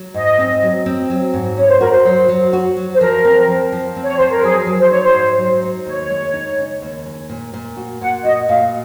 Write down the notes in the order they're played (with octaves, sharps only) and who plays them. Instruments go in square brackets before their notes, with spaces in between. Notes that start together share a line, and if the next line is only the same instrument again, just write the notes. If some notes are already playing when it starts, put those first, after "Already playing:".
Already playing: [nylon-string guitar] F#3
[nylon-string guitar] G#2 [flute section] D#5
[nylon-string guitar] C4
F#3
C4
F#3
G#2
[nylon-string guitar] C#4 [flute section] C#5
[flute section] C5
[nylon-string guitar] F#4 [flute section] A#4
[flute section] C5
[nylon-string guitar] F#3
F#3
F#4
F#3
[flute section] C5
[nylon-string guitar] F3 [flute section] A#4
[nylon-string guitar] C4
F3
F3
C4
[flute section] C#5
[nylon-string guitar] F3 [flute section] C5
[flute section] A#4
[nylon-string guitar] F#3 [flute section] G#4
[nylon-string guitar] F#3
[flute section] C5
[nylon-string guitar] D#4 [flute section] C#5
[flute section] C5
[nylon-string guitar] G#2
F#3
D#4
[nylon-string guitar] D#2 [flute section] C#5
[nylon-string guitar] G#3
D#4
C#3
D#2
G#3
A#2
A#2
F#4
[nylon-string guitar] A#2 [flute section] F#5
[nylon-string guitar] F#4 [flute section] D#5
[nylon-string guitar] A#2 [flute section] F5